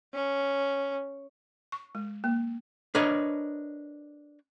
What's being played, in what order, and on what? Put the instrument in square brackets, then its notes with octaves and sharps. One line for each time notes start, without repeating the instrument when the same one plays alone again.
[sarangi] C#4
[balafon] C#6
G#3
A#3
[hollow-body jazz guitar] D4 A#4 B4 C#5 D#5